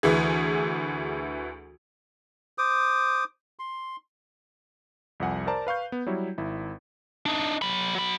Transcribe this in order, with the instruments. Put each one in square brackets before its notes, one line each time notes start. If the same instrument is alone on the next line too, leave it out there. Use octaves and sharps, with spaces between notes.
[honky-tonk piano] D2 E3 G#4
[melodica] C5 D6 D#6
C6
[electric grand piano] C2 F2 F#5 G#5
A#4 C5 D5 A5 A#5
B4 F5 C#6 G6
B3
F#3 G3 E4 C#5
G#1 E4
[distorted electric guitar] D4 D#4
F#3 B5
F#3 B5